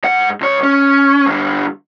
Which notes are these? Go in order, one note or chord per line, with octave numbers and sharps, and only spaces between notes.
G#2 F#5
C#2 C#5
C#4
G2 D3